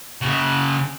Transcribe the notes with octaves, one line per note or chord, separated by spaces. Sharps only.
C#3 F#4